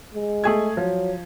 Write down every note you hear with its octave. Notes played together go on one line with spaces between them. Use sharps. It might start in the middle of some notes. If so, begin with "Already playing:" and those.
G#3
A3 G#4 G#6
F3 F#3